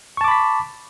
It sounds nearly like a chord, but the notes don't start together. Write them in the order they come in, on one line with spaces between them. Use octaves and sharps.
C#6 A5 D6 B5 B6